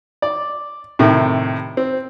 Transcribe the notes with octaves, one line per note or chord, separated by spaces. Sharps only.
D5
A2 C3 D#3
C4